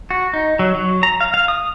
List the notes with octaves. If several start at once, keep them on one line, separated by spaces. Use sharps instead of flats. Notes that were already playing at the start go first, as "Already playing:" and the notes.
F#4
D#4
F#3
F#3
A#5
F5
F5
D#6